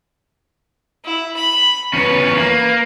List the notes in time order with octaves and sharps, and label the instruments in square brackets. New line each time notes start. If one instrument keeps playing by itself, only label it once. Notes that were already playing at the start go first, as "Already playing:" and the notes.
[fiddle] E4
B5
[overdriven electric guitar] E2 C#4 [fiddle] B4
[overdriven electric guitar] A#3